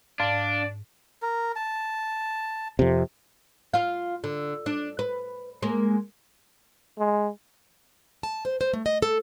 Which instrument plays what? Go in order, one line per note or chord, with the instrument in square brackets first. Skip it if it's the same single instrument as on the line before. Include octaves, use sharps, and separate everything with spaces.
[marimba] G#2 [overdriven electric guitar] D4 [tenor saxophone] D5 [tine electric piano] F5 A5
[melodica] A#4
A5
[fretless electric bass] F2 C3
[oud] F4 F5
D3
D4
B4
G#3 A#3
[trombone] G#3
[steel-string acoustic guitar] A5
C5
C5
A3
D#5
A4